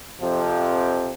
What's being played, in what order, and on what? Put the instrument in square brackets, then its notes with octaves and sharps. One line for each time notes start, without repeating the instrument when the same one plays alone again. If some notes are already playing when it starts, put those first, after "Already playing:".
[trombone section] F2 C3 F3